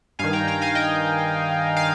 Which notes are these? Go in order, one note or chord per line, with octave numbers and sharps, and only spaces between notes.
G2 D#3 F5 G#5
G5 A#5
G5 A#5
F5 G#5
D#5 G5
F5